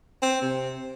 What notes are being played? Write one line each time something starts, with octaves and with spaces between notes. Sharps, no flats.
C4
C3